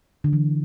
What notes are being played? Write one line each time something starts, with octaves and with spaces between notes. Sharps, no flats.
D3
E3